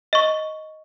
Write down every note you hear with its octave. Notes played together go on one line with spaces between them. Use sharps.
D#5 C#6